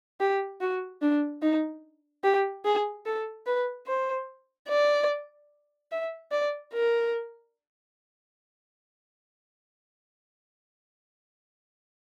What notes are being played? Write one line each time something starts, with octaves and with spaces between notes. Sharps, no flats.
G4
F#4
D4
D#4
G4
G#4
A4
B4
C5
D5
E5
D5
A#4